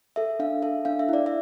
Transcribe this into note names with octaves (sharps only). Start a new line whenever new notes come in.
A4 E5
D4 F5
A4 E5
D4 F5
E5
E4 D5
E5